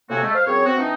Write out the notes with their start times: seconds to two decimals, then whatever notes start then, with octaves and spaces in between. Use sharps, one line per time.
0.10 A2 C3 A#3 C4 F#4 G#5
0.23 G#3 A3
0.34 C5 F5
0.47 F#2 C4 G#4 C#5
0.65 C4 F#4
0.78 E3 C4 D4 D#4